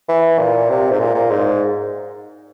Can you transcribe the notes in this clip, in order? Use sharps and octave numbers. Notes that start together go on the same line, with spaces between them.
E3
A#2
C3
G#2
A#2
A#2
G#2